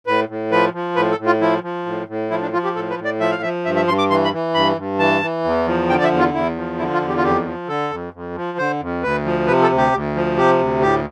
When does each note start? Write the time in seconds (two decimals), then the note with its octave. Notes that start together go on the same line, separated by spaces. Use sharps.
0.07 A2 B4
0.29 A2
0.51 F3 B4
0.74 F3
0.96 A2 B4
1.11 A4
1.18 A2
1.26 F4
1.41 F3 E4
1.63 F3
1.86 A2
2.08 A2
2.31 F3 E4
2.42 D4
2.53 F3 F4
2.64 G4
2.75 A2 A4
2.90 B4
2.98 A2
3.05 D5
3.20 F3 E5
3.31 F5
3.42 F3 E5
3.65 G2 E5
3.76 E5
3.87 G2 C6
3.99 D6
4.10 E3 C6
4.24 B5
4.32 E3
4.54 G2 B5
4.77 G2
4.99 E3 A5
5.22 E3
5.44 E2
5.66 F3
5.89 D3 G5
5.98 D5
6.04 E5
6.11 E2
6.19 F4
6.34 E2 E4
6.56 F3
6.79 D3 E4
6.93 F4
7.01 E2
7.08 G4
7.17 F4
7.24 F2 G4
7.46 F3
7.68 D3 A4
7.91 F2
8.13 F2
8.36 F3
8.58 D3 C5
8.81 F2
9.03 D2 B4
9.25 F3
9.47 C3 B4
9.63 A4
9.70 D2
9.77 G4
9.92 D2
10.15 F3
10.37 C3 G4
10.59 D2
10.81 A2 G4